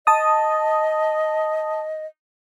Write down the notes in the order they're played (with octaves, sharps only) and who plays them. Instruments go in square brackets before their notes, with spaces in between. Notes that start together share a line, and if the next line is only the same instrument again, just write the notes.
[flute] D#5 [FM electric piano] A5 D#6